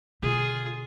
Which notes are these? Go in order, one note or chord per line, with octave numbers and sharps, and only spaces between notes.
B2 D3 F4 G#4